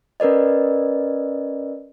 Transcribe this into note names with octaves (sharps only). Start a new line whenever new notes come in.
C#4 A#4 B4 D5 D#5